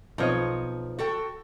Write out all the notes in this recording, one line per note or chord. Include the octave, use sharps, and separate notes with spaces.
B1 F3 C4 C#5 D#5
F#4 A4 G5